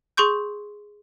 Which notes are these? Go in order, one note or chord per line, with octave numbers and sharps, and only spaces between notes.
G#4 C6 C#6 G6